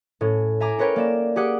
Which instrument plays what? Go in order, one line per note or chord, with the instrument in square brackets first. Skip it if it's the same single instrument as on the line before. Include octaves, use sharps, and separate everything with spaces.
[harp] A2 C#4
E5 G#5 A#5 D6
C#4 A#4 B4 C#5 G5
A#3 D5 E7
G4 G#4 F#5 D6